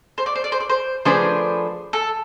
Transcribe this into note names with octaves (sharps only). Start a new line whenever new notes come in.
C5
D5
C5
D5
C5
D5
C5
F3 A3 D4 G#4 B4 C5
A4